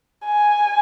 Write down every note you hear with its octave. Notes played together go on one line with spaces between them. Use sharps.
G#5